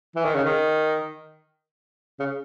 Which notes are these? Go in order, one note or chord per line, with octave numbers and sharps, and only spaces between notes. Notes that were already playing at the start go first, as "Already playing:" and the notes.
E3
D#3
C#3
D#3
C#3